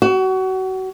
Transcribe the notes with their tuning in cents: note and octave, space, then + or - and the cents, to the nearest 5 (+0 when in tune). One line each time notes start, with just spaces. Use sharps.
F#4 +30